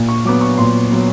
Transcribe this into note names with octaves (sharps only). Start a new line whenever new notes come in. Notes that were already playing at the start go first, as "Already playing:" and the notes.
Already playing: A#2
C#6
F#3 B3 D6
C#6
A#2 C6
F#3 B3